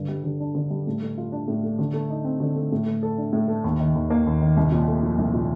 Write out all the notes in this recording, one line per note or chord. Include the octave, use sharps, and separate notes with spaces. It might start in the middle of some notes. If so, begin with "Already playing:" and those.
Already playing: G2 D3
G3
D3
D4
D3
G3
A2
A3
F4
D4
A2
A3
D3
A3
D#4
C4
D3
A3
A2
A3
A4
D4
A2
A3
D#2
D#3
D#2
A#3
D#2
D#3
C2
A#2
A3
F3
C2
A#2